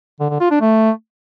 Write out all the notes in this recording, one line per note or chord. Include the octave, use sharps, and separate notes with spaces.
D3
D3
F4
D4
A3